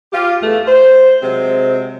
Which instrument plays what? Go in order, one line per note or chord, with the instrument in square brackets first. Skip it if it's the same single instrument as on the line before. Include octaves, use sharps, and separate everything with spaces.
[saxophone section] F4 G4
E2 A3
C5
C3 F#3 G#3 C4